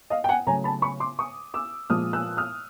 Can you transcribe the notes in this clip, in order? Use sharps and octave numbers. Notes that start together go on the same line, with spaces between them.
D#5 F5
G5
F#5 G#5
C#3 F#3 A3 G#5 A#5
A5 B5
B5 C#6
C6 D6
C#6 D#6
D6 E6
A#2 F3 G#3 D#6 F6
E6 F#6
D#6 F6